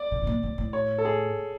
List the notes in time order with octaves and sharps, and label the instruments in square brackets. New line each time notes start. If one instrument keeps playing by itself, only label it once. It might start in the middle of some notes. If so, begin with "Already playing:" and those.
Already playing: [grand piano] D5
[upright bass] B2
A2
A#2
A2
A2
[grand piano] C#5
A4
G#4